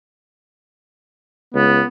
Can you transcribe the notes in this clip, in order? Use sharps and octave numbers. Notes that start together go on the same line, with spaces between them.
C#2 B3